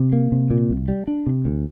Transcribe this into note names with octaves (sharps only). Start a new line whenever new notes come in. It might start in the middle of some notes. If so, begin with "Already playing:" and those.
Already playing: C3
A#3
C3
A#2
C2
G3
D4
C3
D2